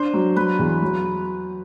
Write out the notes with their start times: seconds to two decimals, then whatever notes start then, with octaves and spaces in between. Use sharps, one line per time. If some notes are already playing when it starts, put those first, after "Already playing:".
Already playing: D4 C5
0.14 F#3
0.36 F#3 B4
0.59 E2
0.82 F#3